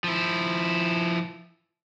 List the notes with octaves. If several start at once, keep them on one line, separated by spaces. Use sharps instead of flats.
F3 E4